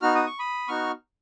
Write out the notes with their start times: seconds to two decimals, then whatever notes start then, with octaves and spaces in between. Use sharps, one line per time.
0.02 B3 D#4 F#4 F6
0.15 D#6
0.27 C#6
0.39 B5 D#6
0.68 B3 D#4 F#4 C#6 F6